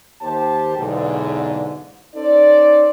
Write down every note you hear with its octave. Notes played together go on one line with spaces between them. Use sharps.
D#2 G4 C5 A5
B1 E2 G#2 D3
C#4 D#4 A4 C5 D5